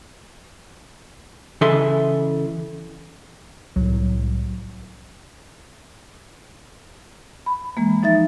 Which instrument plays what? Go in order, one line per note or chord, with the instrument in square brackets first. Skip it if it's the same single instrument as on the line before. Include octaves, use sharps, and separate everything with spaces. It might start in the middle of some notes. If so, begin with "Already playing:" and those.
[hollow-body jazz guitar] C#3 E3 A4 D#5 E5 C6
[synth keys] C2 A2 [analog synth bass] F#3
[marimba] B5
E3 G#3 A#3
F3 D#4 E5 A6